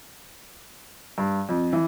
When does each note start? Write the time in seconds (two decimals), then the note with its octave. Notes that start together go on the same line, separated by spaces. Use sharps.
1.18 G2
1.49 F2
1.73 E3